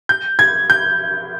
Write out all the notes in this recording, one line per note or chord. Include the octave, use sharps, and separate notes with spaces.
G6
G#6
G6